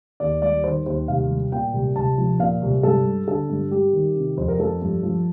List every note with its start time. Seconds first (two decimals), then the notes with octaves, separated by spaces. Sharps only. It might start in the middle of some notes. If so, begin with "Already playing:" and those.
0.20 D#2 D5
0.42 G3 D5
0.64 D#3 C5
0.86 D#2 C5
1.08 C2 F5
1.30 G3
1.52 A#2 G5
1.73 C2
1.96 C2 A5
2.18 F3
2.39 A#2 F5
2.62 C2
2.83 G2 A4
3.06 G3
3.27 D3 A4
3.49 G2
3.71 G3 G4
3.93 D#3
4.15 C3
4.37 F2 C5
4.48 A#4
4.59 F3 A4
4.81 G2
5.03 F3